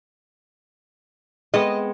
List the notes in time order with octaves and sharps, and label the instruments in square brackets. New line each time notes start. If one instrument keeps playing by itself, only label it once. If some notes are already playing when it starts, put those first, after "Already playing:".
[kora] G#3 B3 C4 [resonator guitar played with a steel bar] D#5